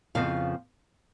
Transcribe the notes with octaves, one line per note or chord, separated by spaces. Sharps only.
F2 C#3 F3 B3 F5